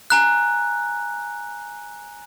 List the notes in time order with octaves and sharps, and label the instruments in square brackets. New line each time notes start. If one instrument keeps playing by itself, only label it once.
[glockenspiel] G#5 A#5 F#6